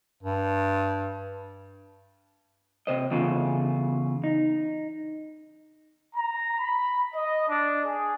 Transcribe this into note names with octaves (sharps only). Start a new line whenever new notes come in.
G2
C3 C5 D#5
E2 C#3 F4 A4
D#4
A#5
B5
D#5
D4
G#4